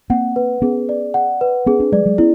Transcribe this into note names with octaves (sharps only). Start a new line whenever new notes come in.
A#3 C4 F#5
B4
B3 C#4 G#4
D5
F#5
B4
B3 C#4 G#4
C4 D4
F#3 G#3 D5
F#3 G#3
B3 C#4 E4